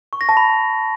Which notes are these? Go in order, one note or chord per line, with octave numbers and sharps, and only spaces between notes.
C#6
A#6
A5
B5